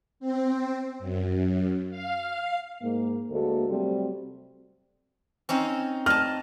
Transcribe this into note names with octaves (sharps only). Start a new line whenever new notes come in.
C4
F#2
F5
G#2 A#3
D2 G#3 A#3 F#4 A4
C3 F#3 G3 A3 C4
C4 C#4 D#4
D#5 A5 F6